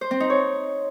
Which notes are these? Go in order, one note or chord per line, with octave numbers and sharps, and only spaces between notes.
C5
C4
D#4
C#5